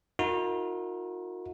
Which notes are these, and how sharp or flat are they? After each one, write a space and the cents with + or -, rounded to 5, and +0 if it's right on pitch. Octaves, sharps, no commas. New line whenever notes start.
D#4 +45 F#4 -40 A#4 -20